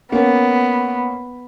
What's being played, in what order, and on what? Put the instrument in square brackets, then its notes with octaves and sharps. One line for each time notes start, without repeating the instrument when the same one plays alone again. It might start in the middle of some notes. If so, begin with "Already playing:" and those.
[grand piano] A#3 C#4 [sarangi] B3